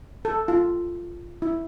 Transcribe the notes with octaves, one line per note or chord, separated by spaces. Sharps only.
A4
F4
E4